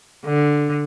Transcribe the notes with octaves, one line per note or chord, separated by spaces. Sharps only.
D3